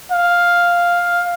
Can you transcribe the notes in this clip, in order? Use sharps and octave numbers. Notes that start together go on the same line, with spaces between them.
F5